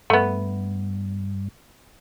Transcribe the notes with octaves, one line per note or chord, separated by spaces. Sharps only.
G2 A3 B3